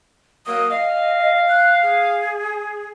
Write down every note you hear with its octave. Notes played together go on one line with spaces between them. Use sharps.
F#3 A#3 D#6
D#5 F5
F#6
G#4